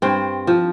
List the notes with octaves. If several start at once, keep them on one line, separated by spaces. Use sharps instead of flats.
G2 C4
F3